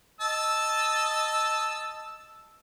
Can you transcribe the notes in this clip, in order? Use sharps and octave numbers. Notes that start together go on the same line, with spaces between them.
D#5 A5 E6